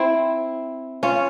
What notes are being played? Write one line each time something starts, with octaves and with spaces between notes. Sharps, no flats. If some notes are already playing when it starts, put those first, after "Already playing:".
Already playing: C4 E4
C#4 F4